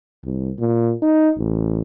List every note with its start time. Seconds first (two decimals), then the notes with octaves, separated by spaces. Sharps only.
0.24 C2
0.59 A#2
1.02 D#4
1.37 A1